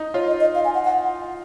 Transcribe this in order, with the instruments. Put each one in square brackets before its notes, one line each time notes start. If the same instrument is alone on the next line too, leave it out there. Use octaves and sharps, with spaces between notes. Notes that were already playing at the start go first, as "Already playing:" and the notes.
Already playing: [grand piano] D#4
[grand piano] F4 [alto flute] C#5
[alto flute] D#5
D#5
F5
G#5
F#5
F#5